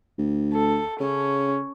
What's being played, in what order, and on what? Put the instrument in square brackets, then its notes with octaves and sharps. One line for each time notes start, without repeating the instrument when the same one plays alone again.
[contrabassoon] D2
[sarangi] A4
[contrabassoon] C#3 [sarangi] C#4